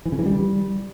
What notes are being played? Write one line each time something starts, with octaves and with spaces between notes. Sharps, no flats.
E3
C#3
E3
G3